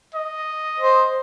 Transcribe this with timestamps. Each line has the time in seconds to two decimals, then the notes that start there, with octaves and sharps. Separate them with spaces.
0.14 D#5
0.80 C5